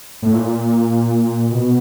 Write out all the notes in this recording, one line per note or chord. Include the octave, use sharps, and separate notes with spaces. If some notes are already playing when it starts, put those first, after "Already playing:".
A2
A#2
B2